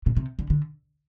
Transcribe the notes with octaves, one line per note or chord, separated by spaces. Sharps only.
B2
C3
D3
D3